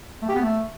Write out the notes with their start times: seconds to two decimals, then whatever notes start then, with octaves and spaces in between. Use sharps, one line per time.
0.22 A3
0.28 G4
0.35 B3
0.41 A3